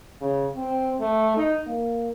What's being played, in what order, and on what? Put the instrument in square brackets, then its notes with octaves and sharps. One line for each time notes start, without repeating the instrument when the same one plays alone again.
[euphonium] C#3
C4
A3
D#4
A#3